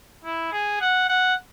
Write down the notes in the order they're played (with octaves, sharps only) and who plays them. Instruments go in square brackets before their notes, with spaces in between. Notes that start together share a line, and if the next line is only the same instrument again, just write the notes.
[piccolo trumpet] E4
G#4
F#5
F#5